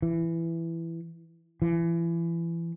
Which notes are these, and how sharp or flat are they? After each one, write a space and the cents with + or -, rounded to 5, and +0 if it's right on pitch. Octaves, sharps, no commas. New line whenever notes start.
E3 +10
E3 +30